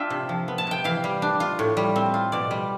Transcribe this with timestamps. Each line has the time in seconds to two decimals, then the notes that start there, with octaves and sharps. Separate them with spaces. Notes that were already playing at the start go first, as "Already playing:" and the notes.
Already playing: D4 F4 E5 G5
0.10 C3
0.29 F3
0.48 B3
0.58 A5
0.67 C3 G5
0.84 E3 F5
1.04 G3
1.22 D4
1.40 F4
1.59 A2
1.77 G3
1.96 C4
2.14 F4
2.32 B2 D5
2.51 G3